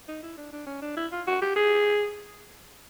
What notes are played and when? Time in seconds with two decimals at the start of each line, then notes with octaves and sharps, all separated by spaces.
0.08 D#4
0.23 E4
0.38 D4
0.52 D4
0.67 C#4
0.82 D4
0.97 E4
1.12 F4
1.27 F#4
1.41 G4
1.56 G#4